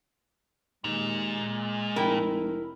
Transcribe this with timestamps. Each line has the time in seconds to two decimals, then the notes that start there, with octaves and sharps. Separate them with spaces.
0.84 D#2 A#2 G#3
1.96 F1 E4 A#4 G5